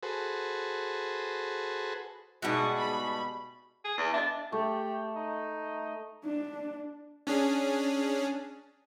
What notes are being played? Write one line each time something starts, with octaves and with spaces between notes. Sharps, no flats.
F#4 G#4 A4 B4 C5
G#2 B2 G3 B3 E4 F#4 G#4 A5
B5
G#4
E2
D4 D#5 E5
A3 G4
D#4
D4
C#4 D4 G#4